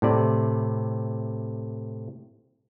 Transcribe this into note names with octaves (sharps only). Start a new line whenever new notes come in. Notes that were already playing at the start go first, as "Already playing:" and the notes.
A2 C3 D5